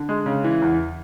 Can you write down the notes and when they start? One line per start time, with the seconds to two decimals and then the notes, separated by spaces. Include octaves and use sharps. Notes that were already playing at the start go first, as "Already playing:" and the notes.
Already playing: D3
0.09 G#3
0.26 C#3
0.44 E3
0.62 E2